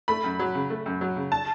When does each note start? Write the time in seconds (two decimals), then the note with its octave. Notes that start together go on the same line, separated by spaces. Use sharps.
0.08 A3 B5
0.24 F#2
0.39 F#3
0.55 C#3
0.70 A3
0.86 F#2
1.01 F#3
1.16 C#3
1.32 A5